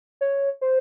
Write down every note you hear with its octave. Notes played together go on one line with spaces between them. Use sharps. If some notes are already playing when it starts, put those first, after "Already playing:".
C#5
C5